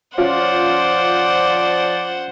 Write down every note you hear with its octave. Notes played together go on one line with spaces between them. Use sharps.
F3 C#4 F4 C5 D5 F5 F#5